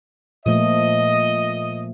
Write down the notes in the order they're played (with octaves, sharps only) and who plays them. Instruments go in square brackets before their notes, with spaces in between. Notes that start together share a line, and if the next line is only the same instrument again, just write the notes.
[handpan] A#2 F3 A3 [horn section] D#5